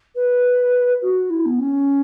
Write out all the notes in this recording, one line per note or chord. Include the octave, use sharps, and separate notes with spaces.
B4
F#4
E4
B3
C#4